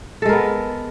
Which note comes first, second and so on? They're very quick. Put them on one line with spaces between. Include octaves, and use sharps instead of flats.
A4 G#3 A#4 B3